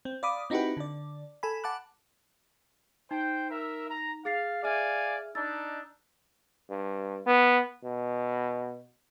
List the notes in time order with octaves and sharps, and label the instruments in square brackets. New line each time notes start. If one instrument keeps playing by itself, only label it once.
[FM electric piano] C4
D5 F5 B5 D6 D#6
C4 D#4 E4 F#4 G4 B4
D3 D5
A4 G#5 B5
F#5 A5 D6 F#6
[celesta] D#4 [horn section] C5 G5
[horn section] A#4 E5
A#5
[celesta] G#4 A6 C7 [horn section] F5
[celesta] G#4 E5 F6 [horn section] D5 F5 G#5
[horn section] D4 D#4 [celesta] E6 A6
[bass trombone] G2
B3
B2